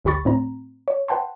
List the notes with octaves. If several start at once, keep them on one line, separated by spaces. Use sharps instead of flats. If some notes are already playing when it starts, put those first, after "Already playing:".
G1 D2 G4 B5 C#6 A6
A2 C4 A#5
C#5
B4 F#5 G5 A5 C6